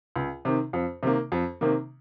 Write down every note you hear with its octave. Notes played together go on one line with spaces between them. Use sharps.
C#2
C3 D#3
F2
C3 D#3 A#3
F2
C3 D#3 A#3